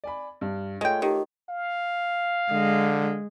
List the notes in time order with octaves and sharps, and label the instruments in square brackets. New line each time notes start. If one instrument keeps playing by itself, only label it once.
[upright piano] D5 G#5 B5
G2
[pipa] G#3 G5 [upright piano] A3 F4 C#5
[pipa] D#3 [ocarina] G4
[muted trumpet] F5
[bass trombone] D3 [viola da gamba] G#3